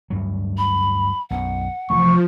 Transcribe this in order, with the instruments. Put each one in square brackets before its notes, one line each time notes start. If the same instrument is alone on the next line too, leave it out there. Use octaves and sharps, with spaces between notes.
[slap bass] D2 G2 F#3
[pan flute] B5
[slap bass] B1 F#2 B2 [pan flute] F#5
[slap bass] F1 E3 A3 [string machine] F3 [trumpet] C#6